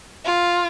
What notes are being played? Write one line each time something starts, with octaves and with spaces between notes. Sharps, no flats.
F4